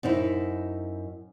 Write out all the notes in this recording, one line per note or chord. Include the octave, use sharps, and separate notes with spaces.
F#2 C4 D#4 E4